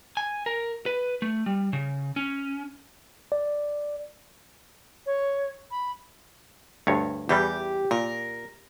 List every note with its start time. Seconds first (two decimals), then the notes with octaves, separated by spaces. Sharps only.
0.17 G#5
0.46 A#4
0.86 B4
1.22 A3
1.46 G3
1.73 C#3
2.16 C#4
3.32 D5
5.06 C#5
5.71 B5
6.87 D2 G2 C#5
7.29 E2 E3 G3 G4
7.91 A#2 A#4